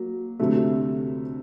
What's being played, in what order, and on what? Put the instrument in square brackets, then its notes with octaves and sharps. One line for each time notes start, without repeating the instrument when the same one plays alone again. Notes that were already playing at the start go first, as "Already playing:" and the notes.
Already playing: [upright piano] F#3 A#3
D2 C3 F#3 A3